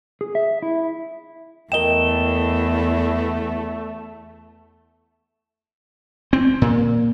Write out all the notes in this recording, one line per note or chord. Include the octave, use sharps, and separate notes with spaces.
G#4
E5
E4
E2 A3 A#4 D#5 G5 E7 G7
C4
A#2